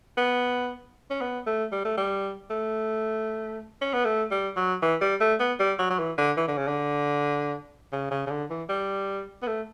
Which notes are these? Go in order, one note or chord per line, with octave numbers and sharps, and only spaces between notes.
B3
C#4
B3
A3
G3
A3
G3
A3
C#4
B3
A3
G3
F#3
E3
G3
A3
B3
G3
F#3
F#3
E3
D3
E3
D3
C#3
D3
C#3
C#3
C#3
D3
E3
G3
B3
A3